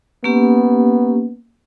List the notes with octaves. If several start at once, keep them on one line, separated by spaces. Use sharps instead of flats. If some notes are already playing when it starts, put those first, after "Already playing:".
A#3 B3 C#4 G4